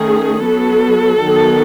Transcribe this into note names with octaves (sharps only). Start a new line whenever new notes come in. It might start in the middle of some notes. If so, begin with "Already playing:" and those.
Already playing: D#3 A3 C#4 G#4
F#3 B3 A4
D#3 F#3 B3